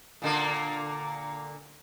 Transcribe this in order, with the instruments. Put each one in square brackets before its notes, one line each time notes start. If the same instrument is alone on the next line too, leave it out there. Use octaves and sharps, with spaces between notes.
[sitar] A#2 D3 A#3